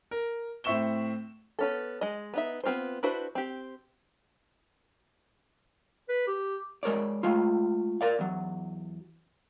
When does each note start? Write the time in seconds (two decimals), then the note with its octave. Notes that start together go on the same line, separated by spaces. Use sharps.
0.11 A#4
0.64 A2 C4 E5 C#6 E7 G7
1.59 B3 C#4 A4
2.01 G#3 D#5
2.34 B3 D#4 E5
2.64 B3 C4 F4 B4 C5
3.03 D4 E4 F#4 B4 C5
3.35 C4 G4
6.09 B4
6.27 G4
6.83 G#3 A#4 C#5 D5
7.23 G#3 A3 F4
8.01 A#4 D5 F5
8.19 E2 F#3